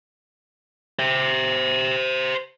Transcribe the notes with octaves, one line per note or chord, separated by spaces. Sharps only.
C5 E5